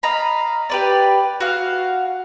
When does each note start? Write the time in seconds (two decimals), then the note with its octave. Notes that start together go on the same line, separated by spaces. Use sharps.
0.03 D#5 F5 A#5 B5
0.70 G4 B4 D5
1.40 F#4 F5